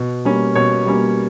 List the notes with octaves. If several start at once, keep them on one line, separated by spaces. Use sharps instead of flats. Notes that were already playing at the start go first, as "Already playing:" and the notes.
Already playing: B2
G3 A#3 C#4
B2 C#5
G3 A#3 C#4